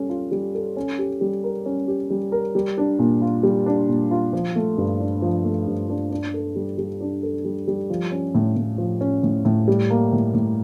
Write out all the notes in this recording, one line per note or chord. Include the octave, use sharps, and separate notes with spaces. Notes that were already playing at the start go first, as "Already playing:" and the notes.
Already playing: G3 C#4 A4
F4
G3
A4
C#4
G4
G3
A#4
C#4
G4
G3
A#4
G3
D4
A#2
F4
G3
D4
A#2
F4
F3
A3
G2
D4
F3
A3
G2
D4
D4
A4
G3
G3
D4
A4
G3
G3
F3
C#4
A2
A2
F3
C#4
A2
A2
G3
A#3
A2
A2